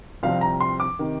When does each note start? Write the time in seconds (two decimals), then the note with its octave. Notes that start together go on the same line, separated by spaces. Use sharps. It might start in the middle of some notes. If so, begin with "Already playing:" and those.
0.23 C2 C3 F3 C4 F5
0.41 A#5
0.61 C6
0.80 D6
0.99 C3 D#3